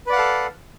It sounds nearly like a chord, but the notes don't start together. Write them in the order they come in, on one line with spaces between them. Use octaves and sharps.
B4 D5 F#5 F5 A4